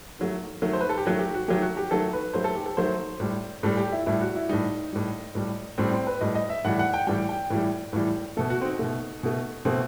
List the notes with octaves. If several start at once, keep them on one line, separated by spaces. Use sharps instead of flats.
D#3 F#3 A3
D#3 F#3 A3
C5
B4
A4
G4
D#3 F#3 A3 F#4
G4
F#4
D#3 F#3 A3 G4
F#4
G4
D#3 F#3 A3 A4
B4
D#3 F#3 A3 C5
A4
G4
A4
D#3 F#3 A3 C5
A2 G3
A2 G3 A4
G4
E4
A2 G3 E4
F#4
E4
A2 G3 D#4
A2 G3
A2 G3
A2 G3 C4
C4
B4
A2 G3 D#5
D#5
E5
A2 E3 G3 F#5
F#5
G5
A2 E3 G3 G5
G5
A2 E3 G3
A2 E3 G3
B2 A3 A4
F#4
C4
D#4
B2 A3
B2 A3
B2 A3 C4